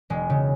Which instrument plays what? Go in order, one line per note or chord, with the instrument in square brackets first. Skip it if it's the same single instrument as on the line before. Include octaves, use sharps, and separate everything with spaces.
[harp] E1 G#3
C#3